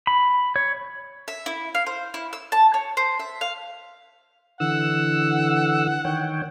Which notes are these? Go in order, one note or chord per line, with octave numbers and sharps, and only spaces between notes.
B5
C#5
E5
E4
F5
C5
E4
E6
A5
C#5
C5
E5
F5
D3 E3 F#5 E6
D#3 C#5 G5